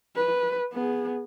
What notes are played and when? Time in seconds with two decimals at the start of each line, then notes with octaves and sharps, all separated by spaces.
0.16 B4
0.73 B3 G#4